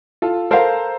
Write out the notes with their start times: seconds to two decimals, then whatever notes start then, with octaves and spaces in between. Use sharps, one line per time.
0.22 F4 A4
0.51 A4 A#4 C5 F5 A#5